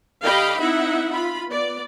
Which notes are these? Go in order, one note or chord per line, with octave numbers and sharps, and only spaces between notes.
D3 G4 D#5 F5 G5 B5
C4 D#4 E4 E5 F#5
F4 B5
B3 D5